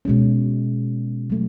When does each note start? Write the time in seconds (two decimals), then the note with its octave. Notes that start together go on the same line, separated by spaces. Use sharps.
0.05 B2 G#3 C#4
1.30 F#3 A3